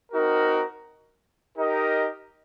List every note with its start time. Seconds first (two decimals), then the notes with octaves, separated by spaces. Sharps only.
0.12 C4 D#4 F#4 A#4
1.57 D#4 G4 A#4 D#5